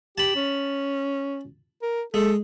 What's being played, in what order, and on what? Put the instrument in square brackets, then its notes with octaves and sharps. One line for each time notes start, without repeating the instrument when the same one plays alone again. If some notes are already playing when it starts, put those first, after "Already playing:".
[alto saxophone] G4 [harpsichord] A5 B5
[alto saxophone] C#4
A#4
[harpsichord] G#3 [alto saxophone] A4